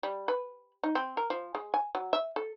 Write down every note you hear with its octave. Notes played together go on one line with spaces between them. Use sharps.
G3
B4
D#4
C4
A#4
F3
G#3
G#5
F#3
E5
A4